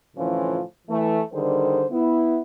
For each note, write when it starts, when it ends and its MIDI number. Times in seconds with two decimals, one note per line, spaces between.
0.15 0.60 45
0.15 0.60 50
0.15 0.60 52
0.15 0.60 53
0.15 0.60 61
0.15 0.60 65
0.88 1.20 52
0.88 1.20 57
1.33 1.85 50
1.33 1.85 51
1.33 1.85 55
1.33 1.85 68
1.33 1.85 72
1.90 2.39 59
1.90 2.39 64